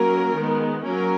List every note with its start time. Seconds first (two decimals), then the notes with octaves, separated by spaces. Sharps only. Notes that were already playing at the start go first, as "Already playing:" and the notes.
Already playing: F#3 A#3 C#4 A#4
0.35 D#3 G#3 B3
0.84 F#3 A#3 C#4 A#4